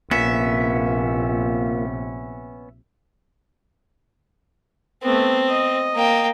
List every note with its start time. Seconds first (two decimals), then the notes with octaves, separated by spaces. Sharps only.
0.11 A#1 C3 A#3 B3 C#4 F4 E5
5.03 A3 B3 C4
5.49 D#5
5.95 A#3 G5